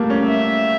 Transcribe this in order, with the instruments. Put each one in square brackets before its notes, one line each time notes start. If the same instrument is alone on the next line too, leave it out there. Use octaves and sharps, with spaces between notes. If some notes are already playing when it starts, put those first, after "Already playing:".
Already playing: [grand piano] G3 A3 A#3
C#4
[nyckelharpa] E5